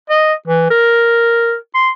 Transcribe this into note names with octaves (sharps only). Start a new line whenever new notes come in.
D#5
E3
A#4
C6